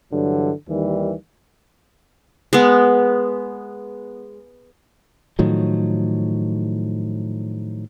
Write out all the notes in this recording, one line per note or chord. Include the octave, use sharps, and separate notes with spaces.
G2 D3 E3 F#3
D#2 D#3 E3 G3
G#3 B3
A2 D#3 F3 F#3